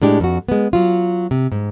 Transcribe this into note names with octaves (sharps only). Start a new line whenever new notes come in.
A2 G#3 D4 G4
F2 F#4
G#3 B3
F#3 F4
C3
G#2